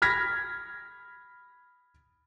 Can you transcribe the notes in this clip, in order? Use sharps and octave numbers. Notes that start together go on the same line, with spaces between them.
B5 F6 G#6 A#6 B6